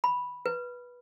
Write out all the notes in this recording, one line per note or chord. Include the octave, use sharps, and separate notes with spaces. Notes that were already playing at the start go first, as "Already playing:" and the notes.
B5
B4